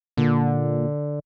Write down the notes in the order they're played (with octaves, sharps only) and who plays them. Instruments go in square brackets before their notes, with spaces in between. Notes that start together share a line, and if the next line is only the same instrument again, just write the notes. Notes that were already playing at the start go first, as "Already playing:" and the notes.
[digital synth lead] A#2 [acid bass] D3